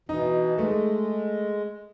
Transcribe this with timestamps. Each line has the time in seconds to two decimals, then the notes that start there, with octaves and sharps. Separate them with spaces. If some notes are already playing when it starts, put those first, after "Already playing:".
0.09 B2 E3 D#4
0.58 G#3 A3